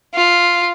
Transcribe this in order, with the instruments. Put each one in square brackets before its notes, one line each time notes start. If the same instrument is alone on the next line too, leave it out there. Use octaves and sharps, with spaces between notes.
[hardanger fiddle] F4